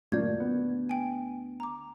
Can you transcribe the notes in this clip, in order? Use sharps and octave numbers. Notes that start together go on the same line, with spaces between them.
D#1 F#2 A#2 A3 A#3 D5 G6 G#6
D2 B3
G5 G#5
A#5 D6